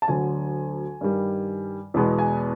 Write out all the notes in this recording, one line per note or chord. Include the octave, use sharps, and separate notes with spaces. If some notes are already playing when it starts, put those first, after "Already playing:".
A5
D2 D3 F#3 G#5
G2 D#3 G3
E2 B2 G#3 B3
G#5